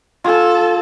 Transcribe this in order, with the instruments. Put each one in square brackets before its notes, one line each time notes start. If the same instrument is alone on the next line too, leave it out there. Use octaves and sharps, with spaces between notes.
[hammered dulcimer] F4 G#5 [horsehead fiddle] A4 A5